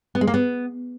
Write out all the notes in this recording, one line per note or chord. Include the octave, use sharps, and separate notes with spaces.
B3
G#3
A#3
B3